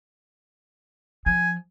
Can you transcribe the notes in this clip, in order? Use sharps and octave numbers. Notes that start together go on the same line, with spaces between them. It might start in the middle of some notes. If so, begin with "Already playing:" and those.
F3 G#5